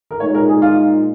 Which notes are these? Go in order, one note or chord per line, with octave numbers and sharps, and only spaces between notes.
A#4
A#2 G#3 D#4 C#5
A#4
G#4
F4